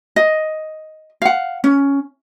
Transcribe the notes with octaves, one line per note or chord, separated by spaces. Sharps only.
D#5
F5 F#5
C#4